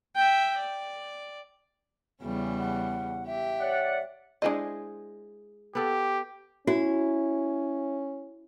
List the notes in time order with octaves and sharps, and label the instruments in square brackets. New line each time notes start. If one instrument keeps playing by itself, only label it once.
[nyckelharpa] E5 G5
D5
[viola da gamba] E2 C#3 G3
[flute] F#5
[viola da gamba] G4 [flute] E5
[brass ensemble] C#5 D5 F#5
[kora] G#3 G#4 C5 [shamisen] D4 E4 D#5
[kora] B3 A4 [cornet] G4
[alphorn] C#4 [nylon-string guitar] E4 [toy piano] F#4